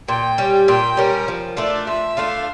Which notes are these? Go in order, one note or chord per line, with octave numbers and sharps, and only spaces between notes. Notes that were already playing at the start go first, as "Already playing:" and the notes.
A#2 G5
G3 C#4
A#2 G5
G3 C#4 A#4
F3
A3 D4 F4 D5
F3 E5
A3 D4 F4 F5